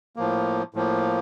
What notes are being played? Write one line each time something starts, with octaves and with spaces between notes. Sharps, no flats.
A2 F3 A#3
A2 F3 A#3